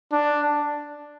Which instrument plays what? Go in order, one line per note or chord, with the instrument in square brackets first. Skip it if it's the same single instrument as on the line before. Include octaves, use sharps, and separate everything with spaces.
[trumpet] D4